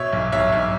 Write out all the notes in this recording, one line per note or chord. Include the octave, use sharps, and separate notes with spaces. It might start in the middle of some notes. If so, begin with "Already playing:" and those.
Already playing: B2 C#5 E5
B1
B1 C#5 E5
B1